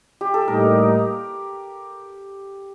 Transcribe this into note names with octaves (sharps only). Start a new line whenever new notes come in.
G4
A4
A2 G3 A#3 D#4 A#4